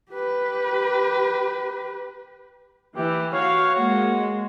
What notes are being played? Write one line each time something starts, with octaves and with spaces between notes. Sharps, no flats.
G4 B4
E3 G4
F#4 C#5 F5
G#3 A#3 F#4